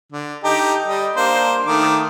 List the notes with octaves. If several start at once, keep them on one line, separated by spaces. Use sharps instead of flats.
D3
D#4 G4 A4
G3 D#5
A#3 D4 C5
D#3 A3 D6